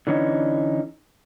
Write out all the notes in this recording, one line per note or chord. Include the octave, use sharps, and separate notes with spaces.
D3 E3 C#4 D#4